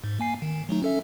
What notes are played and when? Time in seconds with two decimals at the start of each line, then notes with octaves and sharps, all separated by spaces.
0.04 G#2
0.19 A#3 G#5 C7
0.42 D#3
0.69 F#3 A3 D#4
0.83 C#4 A4 E5